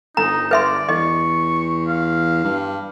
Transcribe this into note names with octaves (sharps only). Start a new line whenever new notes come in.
G1 D#4 A#5
B4 D5 E5 C6
E2 D#5 C#6
F5
G2